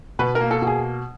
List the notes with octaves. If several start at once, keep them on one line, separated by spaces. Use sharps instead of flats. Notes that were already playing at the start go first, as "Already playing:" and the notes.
B2 B4
A#4
A#3
A4
B2
G#4